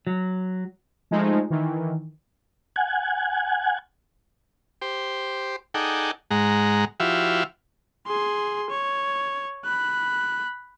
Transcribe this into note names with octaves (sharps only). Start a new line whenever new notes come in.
F#3
F3 G#3 A3 D#4
D#3 E3
F#5 G#5
G4 C5
D#4 G#4 A4 D5 F#5 G5
G#2 G#3 F#5 A#5
F3 E4 F#4 G4 E5 F5
G#4 C6
C#5
B5 F#6